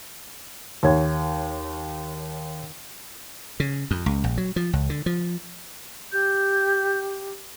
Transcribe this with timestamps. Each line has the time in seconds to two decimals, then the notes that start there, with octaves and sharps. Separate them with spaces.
0.83 D#2 C#5 G#6
3.60 C#3
3.91 F2
4.06 C#2
4.24 A#1
4.37 F#3
4.56 F3
4.73 C#2
4.90 D3
5.06 F3
6.12 G4 G6